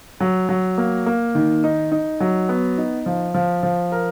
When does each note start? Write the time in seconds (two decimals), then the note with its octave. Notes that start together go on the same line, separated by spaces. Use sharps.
0.20 F#3
0.49 F#3
0.78 A#3
1.06 A#3
1.35 D#3
1.64 D#4
1.92 D#4
2.20 F#3
2.49 B3
2.78 D#4
3.06 F3
3.34 F3
3.63 F3
3.92 A#4